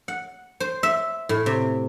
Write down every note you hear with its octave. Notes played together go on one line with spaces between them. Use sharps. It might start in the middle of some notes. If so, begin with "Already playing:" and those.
F#5
C5
E5
A2
C3